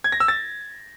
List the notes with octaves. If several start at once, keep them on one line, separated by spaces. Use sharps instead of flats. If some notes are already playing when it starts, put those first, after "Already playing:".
G#6
A#6
E6
A6